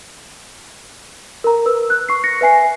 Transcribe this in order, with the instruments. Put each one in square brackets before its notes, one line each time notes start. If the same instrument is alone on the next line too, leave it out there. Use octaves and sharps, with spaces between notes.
[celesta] A#4 A#5
B4 E6
F#6
C#6 C7
A#6 C#7
B4 E5 G#5 C7